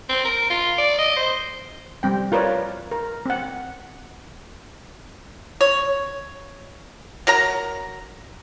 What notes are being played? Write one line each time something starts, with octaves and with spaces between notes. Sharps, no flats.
C4
A#4
F4
D5
D#5
C5
G3 C4 G5
F4 A#4 B4 C#5 D5
A#4
C4 F#5
C#5
F#3 A#4 A#5